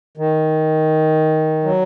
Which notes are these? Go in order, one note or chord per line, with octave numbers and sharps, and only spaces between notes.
D#3
F#3